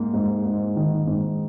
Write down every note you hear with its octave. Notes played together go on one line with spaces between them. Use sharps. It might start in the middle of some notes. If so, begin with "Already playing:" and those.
Already playing: G#2 A#3
G#2
G#2
D#3
G#2